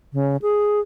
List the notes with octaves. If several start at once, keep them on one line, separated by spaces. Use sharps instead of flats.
C#3
G#4